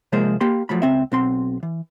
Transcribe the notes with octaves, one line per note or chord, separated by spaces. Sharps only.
C3 F3 G#3 A#3 G#4 C5
A#3 G4 B5 C6
F3 F#3 A3 B5
C#2 C4 E5
B1 C4 C6
E3